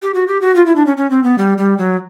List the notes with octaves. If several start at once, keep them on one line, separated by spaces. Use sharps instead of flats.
G4
F#4
G4
F#4
F4
E4
D4
C#4
C#4
C4
B3
G3
G3
F#3